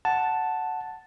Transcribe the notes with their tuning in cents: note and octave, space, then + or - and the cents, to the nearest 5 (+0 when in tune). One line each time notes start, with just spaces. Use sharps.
F#5 +0 A5 +0